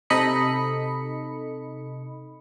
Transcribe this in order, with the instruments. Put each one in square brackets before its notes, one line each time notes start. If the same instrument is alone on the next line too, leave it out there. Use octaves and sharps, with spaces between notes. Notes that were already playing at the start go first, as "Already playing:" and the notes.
[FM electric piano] C3 D#4 A4 D#5 B5 C#7